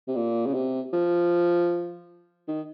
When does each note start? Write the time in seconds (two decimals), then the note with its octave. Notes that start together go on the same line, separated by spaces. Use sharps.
0.08 C3
0.16 A#2
0.46 C#3
0.54 C3
0.93 F3
2.48 D#3